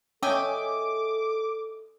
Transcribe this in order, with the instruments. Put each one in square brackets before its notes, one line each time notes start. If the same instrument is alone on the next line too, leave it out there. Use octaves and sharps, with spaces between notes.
[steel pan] C#4 G5 [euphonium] A4 [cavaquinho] D#5 E5 G#5 [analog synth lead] D6